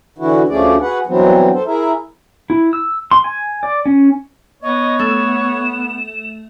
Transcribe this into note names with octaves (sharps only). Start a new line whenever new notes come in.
D3 E3 E4 F#4
D2 F3 A3 C#4 G#4 D5
F#4 G#4 B4 F#5
G2 E3 F#3 B3 C4
A4 C5
E4 G#4 A#4 E5
E4
E6
C6
G#5
D5
C#4
B3 C#5 D#5
A3 E7